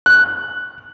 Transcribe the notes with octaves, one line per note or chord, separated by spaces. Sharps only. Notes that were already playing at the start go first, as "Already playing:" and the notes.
F#6